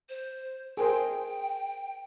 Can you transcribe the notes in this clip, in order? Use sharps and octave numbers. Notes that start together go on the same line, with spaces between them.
C5
G#4 A#4 C5 G5